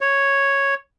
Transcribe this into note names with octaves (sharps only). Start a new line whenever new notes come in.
C#5